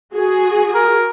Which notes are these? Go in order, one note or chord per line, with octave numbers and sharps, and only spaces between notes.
F#4 G#4
A#4